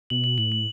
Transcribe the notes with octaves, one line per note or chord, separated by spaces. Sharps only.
B2 F#7
F#7
A2 F#7
F#7